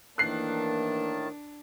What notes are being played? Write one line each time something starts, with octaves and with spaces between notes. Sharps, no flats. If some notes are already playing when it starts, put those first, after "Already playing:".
A2 D#3 E3 A#3 D4 A5 F#6 C7